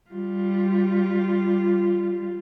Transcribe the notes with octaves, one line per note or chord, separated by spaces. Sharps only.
G3 F4